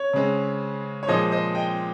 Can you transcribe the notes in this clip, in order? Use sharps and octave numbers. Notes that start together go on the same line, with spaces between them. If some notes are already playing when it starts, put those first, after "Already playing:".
Already playing: C#5
C#3 G#3 C4
C#5
A#2 F3 G#3 C5 D#5
C5 D#5
D#5 G5